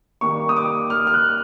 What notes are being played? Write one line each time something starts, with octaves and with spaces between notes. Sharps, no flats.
D#3 G3 A#3 C#6
D#6
D6
F6
F6
F#6